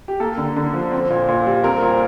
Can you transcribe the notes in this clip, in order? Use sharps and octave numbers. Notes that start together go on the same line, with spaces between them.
G4
A#3 A4
D3
D3
F3
C4
A#2
A#2
G3
C4 A#4
A#2